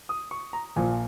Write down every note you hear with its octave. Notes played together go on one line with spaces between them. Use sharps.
D#6
C#6
A#5
A#1 A#2 F3 G#5